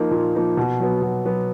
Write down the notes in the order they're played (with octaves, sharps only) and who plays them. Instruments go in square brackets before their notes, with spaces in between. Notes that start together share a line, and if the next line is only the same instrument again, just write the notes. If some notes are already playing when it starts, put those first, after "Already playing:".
Already playing: [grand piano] F3 A#3 D#4
A#2
F3 A#3 D#4
B2
F#3 B3
B2
F#3 B3